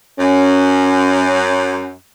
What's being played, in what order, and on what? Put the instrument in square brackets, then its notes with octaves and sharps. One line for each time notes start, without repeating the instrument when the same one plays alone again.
[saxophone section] F#2 [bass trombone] C#4